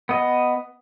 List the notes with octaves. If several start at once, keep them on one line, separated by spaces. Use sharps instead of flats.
B3 D#5